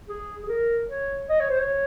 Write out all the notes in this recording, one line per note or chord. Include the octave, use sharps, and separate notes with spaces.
G#4
G#4
A#4
C#5
D#5
C#5
C5
C#5